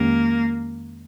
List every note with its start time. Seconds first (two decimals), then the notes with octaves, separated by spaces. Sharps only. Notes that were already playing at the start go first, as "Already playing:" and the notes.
Already playing: F2 D#3 G#3 A#3 C#4 G4